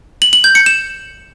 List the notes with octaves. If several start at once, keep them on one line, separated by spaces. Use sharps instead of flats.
F#7
F#7
G6
C#7
E7